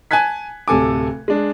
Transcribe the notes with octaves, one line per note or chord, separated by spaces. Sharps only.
G#5 A5 F#6 G#6 B6
D1 C3 A4 G#5 D6
G#3 D4